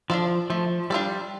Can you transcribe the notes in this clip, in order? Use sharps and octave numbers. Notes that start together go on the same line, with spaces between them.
F3 D4 F4 A4 D5
F3 A3
G3 D4 F4 A4 D5